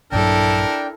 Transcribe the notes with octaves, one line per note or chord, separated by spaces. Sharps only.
A#1 G2 F#3 D4 E4 A4 A#4 G5